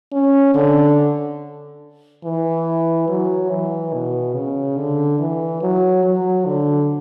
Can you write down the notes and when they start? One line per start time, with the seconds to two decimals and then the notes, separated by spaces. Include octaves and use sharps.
0.13 C#4
0.55 D3
2.24 E3
3.09 F#3
3.51 E3
3.93 B2
4.34 C#3
4.77 D3
5.19 E3
5.62 F#3
6.04 F#3
6.46 D3